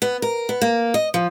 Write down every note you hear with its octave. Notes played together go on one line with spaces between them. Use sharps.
B3
A#4
B3
A#3
D#5
F3